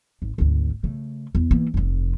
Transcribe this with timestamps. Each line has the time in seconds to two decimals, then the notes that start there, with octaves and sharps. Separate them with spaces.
0.22 G#1
0.38 G#1 D2
0.83 C#3 A3
1.35 E2 E3
1.51 E3 A#3
1.74 F1 F2